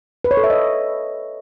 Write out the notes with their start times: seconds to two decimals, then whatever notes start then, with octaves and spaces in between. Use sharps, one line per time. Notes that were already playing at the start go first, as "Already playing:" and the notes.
0.24 B4
0.31 C#5
0.37 A4
0.44 E5
0.50 D#5